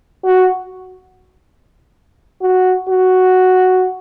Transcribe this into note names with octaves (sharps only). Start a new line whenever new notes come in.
F#4
F#4
F#4